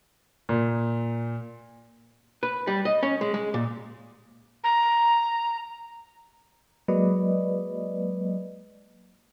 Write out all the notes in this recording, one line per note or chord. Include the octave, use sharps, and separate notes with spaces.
A#2
B4
G3
D#5
C#4
G#3
G#3
A#2
A#5
F#3 G#3 A#3 B4 D5 D#5